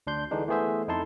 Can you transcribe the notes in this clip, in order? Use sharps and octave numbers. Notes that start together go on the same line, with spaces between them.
D2 D4 C6 G6
D3 E3 G#3 D4 D#4
E3 A3 B3 G#4 C5 E5
F2 D#4 E4 A4 A5 C6